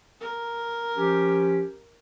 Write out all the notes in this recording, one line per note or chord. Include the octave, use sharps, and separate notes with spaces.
A#4
F3 C#4 G4